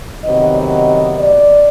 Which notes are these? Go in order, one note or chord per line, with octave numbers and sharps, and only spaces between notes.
C3 D#3 F#3 B3 D#5
D#5
D5